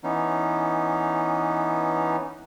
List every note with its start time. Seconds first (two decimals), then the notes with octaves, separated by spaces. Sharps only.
0.04 E3 B3 C#4 D#4